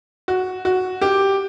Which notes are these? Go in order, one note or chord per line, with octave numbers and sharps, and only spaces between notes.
F#4
F#4
G4